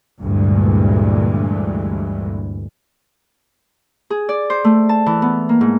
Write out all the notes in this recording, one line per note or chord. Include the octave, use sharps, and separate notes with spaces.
D2 G2 A#2 E3 G#3
G#4
D5
C5
A3
A5
E3
B3
A#3
G#2